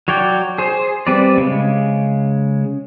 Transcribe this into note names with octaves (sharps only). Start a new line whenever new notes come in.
F#3 C#5 D5 G5
G#4 C5
G3 C4 B4 D5
C#3 G#3